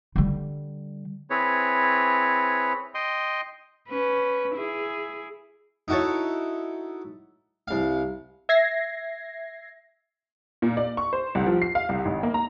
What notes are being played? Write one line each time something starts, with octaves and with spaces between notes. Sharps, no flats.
D3 G3
C4 E4 G#4 B4 C#5
D#5 G5 C6 D#6
C#4 B4
E4 G#4
D#4 E4 F#4 A4 C#5
C2 F5
E5 G#6 A#6 C7
A#2
D5
C#6
C5
C2
F3
C7
F5
C2
G#1
A#3
A#5